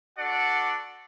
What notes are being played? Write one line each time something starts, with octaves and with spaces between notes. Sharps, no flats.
D4 F#4 A4 D5 F#5